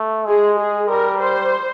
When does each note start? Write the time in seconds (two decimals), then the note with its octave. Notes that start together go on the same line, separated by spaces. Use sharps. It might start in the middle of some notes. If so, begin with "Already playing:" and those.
Already playing: A3
0.27 G#3 G#4
0.59 G#4
0.89 G3 A#4
1.20 C5